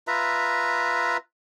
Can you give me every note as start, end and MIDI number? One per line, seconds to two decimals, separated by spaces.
0.07 1.17 65
0.07 1.17 71
0.07 1.17 76
0.07 1.17 82